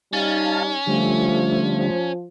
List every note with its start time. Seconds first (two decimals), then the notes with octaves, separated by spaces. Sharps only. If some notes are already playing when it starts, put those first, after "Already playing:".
0.13 G3 C#4 D#4 F5 A5
0.87 D3 F3 G3 A3